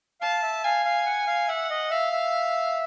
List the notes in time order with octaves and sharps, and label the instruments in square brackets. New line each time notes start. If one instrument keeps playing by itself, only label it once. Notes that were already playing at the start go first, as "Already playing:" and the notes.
[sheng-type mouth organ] F5 [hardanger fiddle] A5
[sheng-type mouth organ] E5
[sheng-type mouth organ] F5 [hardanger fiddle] G#5
[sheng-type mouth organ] F5
F#5
F5
[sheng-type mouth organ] E5 [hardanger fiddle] F#5
[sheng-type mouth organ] D#5
[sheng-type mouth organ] E5 [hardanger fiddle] F5
[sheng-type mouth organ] E5